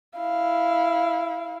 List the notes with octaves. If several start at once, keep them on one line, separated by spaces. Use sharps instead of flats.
E4 F5